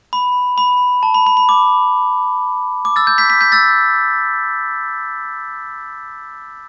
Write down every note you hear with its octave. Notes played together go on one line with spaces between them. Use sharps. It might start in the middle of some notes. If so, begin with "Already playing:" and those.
B5
B5
A5
B5
B5
B5
D6
D6
E6 A6
G6
G6 B6
G6 B6
G6 B6
E6 A6